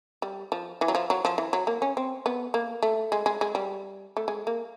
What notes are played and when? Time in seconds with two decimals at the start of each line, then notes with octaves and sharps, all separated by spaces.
0.22 G3
0.52 F3
0.81 E3
0.88 F#3
0.95 F3
1.10 F#3
1.25 F3
1.38 E3
1.53 F#3
1.67 A#3
1.82 C#4
1.97 C4
2.26 B3
2.54 A#3
2.83 A3
3.12 G#3
3.26 G#3
3.41 G#3
3.55 G3
4.17 A3
4.28 G#3
4.47 A#3